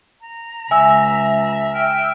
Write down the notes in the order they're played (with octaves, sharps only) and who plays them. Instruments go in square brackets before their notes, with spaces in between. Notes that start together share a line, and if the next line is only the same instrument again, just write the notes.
[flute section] A#5
[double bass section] C#2 [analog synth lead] E5 [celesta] G#5 E6
[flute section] G5 F6